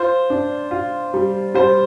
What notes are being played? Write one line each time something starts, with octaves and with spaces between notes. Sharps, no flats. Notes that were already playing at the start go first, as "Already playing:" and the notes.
Already playing: F4 C5
D4
F4
G3
G3 C5